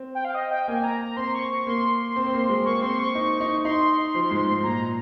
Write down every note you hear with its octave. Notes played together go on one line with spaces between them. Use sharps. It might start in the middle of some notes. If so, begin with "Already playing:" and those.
Already playing: C4
G5
F5
D#5
G5
A#3 G#5
A#5
A#5
C4 C6
C#6
C#6
A#3 C6
C4
C4
A#3
G#3
A#3 C#6
C4 C6
C#6
D#4
D#4
D#4 C6
F3
G#2
G#2
A#2 A#5